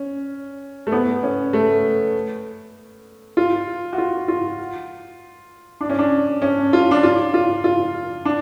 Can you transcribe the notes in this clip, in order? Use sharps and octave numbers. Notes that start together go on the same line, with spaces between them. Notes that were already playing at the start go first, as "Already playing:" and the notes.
Already playing: C#4
A3
B3
C#4
A3
F4
F#4
F4
F4
D4
C#4
D4
C#4
F4
D4
F4
F4
F4
D4